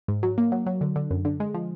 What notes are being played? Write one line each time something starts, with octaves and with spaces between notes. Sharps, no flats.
G#2
F#3
A#3
F#3
F#3
D3
D3
F#2
D3
G#3
F3